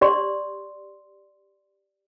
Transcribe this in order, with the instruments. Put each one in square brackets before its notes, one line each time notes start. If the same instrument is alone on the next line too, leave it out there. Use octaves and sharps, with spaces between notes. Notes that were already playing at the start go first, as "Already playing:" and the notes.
[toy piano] G4 D5 C6